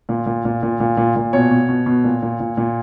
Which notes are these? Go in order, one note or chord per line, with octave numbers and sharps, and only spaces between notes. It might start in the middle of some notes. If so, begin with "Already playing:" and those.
A#2
A#2
A#2
A#2
A#2
A#2
A#2
B2 C#5
B2
B2
B2
A#2
A#2
A#2
A#2